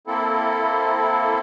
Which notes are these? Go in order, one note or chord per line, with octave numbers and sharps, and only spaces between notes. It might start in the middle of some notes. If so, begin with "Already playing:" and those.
A#3 C4 E4 A4